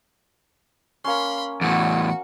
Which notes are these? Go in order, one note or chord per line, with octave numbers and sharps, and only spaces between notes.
A#3 C#4 B5 C6
E2 A2 F#4 F#5